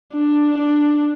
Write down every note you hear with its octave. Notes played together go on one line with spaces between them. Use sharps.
D4
D4